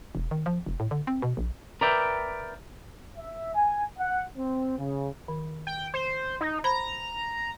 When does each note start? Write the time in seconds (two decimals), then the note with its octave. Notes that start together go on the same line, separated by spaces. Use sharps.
0.15 E1
0.31 D#3
0.46 F3
0.66 F1
0.80 A2
0.91 D3
1.07 C4
1.22 B2
1.37 A#1
1.81 A#4 B4 D5 E5 G5
3.18 E5
3.55 G#5
3.98 F#5
4.37 C4
4.78 C#3
5.28 D#3
5.67 G5
5.94 C5
6.41 D#4
6.64 C5 A#5 B5